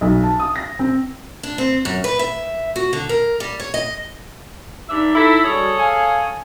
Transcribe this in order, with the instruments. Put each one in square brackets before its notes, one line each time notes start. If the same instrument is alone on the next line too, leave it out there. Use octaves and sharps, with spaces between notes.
[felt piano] B1
A5
D#6
A#6
C4
[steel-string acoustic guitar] D4
C4
F#2
B4
E5
F#4
D3
A#4
G3
C#5
D#5
[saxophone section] G2 D4 E5 [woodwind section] D#4
[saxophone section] E4 A4
[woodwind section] G3 D4 F#4 [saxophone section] G#4 A4 C#5
[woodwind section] F5 G#5